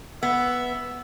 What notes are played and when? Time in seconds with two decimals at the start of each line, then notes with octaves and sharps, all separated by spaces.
0.23 B3 E5